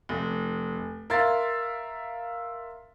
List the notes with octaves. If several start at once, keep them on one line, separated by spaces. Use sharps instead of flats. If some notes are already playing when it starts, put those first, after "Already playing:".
F1
A#4 E5 F5 C6 A6